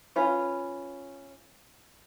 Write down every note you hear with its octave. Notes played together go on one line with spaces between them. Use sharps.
C#4 F4 B4